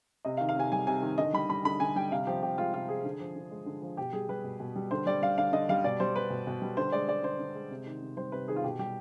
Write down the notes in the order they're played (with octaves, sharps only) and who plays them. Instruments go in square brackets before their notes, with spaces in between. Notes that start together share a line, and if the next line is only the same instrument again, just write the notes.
[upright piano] C3 D#5
F5
D#3
F5
C3 G#5
G3 G#5
C3 G#5
D#3
D3 D#5
G3 B5
G3 B5
D3 B5
D3 G#5
G3 G5
C3 F5
F3 G4
C3 G4
G#3 F4
C3 F4
F3 G#4
D3
F3
D3
G#3
D3
F3
B2 G4
G3 G#4
G3 B4
B2
B2
G3
D3 C5
G3 D5
G3 F5
D3 F5
D3 D#5
G3 F5
B2 D5
G3 C5
G3 B4
B2
B2
G3
D3 C5
G#3 D5
G#3 D5
D3 C5
D3
G#3
C3
D#3
C3
G3 C5
C3 B4
D#3 G#4
F4
B2 G4
G3 G4